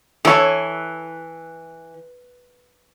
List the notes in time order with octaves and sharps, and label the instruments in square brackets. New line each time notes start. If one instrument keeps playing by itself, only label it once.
[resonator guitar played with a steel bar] E3 [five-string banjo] A4 C#5